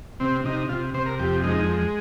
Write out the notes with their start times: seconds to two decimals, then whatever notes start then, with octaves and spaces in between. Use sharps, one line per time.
0.20 C3 C4
0.45 C3 D#4
0.69 C3 F4
0.94 C3 C5
1.06 A#4
1.20 F2 G4
1.44 G#3 D#4